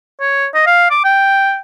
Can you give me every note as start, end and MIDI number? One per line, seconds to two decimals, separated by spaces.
0.20 0.47 73
0.54 0.64 75
0.66 0.90 77
0.91 1.01 86
1.04 1.58 79